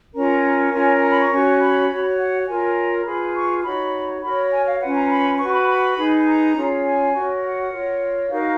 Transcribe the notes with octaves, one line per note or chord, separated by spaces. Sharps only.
C#4 F4 A#4 C#5 A#5
C#4 F4 A#4 C#5 G#5
A#5
B5
C#6
C#4 F#4 C#5
B5
F#4 C#5
F#5
F4 A#4 C#5 G#5
F4 G#4 B4 B5
C#6
D#4 F#4 C#5 B5
F#4 A#4 C#5 B5
G#5
F5
C#4 F4 B4 F#5
A#5
B5
F#4 B4 C#6
B5
B5
D#4 G#4 B4
A#5
C#4 F4 G#4 C#5
G#5
F#4 A#4 C#5
F#5
F4 A#4 C#5
D#4 F#4 A#4 F5